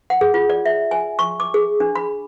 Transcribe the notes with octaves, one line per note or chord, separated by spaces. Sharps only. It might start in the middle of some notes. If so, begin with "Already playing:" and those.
F#5
G#4
F4
D5
E5
G#5
C#6
D6
G#4
D4
B5